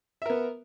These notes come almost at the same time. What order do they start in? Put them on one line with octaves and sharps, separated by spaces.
E5 A#4 B3